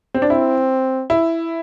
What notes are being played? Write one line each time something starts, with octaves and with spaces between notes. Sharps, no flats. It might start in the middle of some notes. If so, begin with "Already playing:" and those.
C4
D4
C4 E4
E4